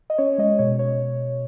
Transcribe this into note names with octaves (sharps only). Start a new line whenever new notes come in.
D#5
C#4 C#5
G#3 D#5
B2 C#5
C#5